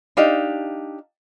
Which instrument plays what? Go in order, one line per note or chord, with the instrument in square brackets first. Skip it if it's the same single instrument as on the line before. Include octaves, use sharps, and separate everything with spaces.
[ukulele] D4 D#4 G4 F5